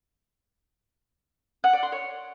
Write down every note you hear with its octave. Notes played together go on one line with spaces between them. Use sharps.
F#5
D5
C6
C#5